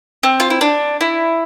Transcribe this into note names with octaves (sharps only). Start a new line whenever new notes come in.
C4
F4
E4
D4
E4